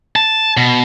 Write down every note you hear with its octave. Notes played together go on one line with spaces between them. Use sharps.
A5
B2